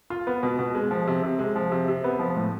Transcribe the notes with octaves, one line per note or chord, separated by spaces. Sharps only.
F4
B3
B2
B2
G#3
F3
C3
C3
G#3
F3
C3
C3
B3
F3
A2